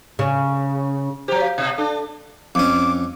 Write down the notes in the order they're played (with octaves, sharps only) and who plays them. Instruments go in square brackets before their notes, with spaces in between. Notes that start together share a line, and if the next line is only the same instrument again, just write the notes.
[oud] C#3
[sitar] F#3 G4 [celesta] C5 A#5
[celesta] F5
[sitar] B2
[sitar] D4 [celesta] A4
[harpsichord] F2 C#4 [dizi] D6